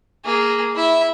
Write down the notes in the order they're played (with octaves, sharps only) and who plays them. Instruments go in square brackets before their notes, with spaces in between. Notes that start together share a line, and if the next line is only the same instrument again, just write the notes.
[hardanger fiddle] A#3 G#4
E4 E5